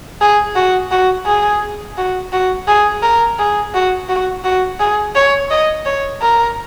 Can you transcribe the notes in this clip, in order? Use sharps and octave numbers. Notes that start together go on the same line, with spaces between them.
G#4
F#4
F#4
G#4
F#4
F#4
G#4
A#4
G#4
F#4
F#4
F#4
G#4
C#5
D#5
C#5
A#4